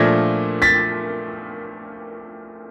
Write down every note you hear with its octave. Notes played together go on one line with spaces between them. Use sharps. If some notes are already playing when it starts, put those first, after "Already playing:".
Already playing: A#2 F3 A3 D4 G#6 A#6
A6 B6